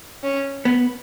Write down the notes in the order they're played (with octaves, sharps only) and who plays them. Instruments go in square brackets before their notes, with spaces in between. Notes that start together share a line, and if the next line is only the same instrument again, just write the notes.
[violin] C#4
[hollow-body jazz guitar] B3